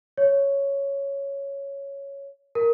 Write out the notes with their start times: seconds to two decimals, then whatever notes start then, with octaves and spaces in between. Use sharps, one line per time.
0.18 C#5
2.55 A#4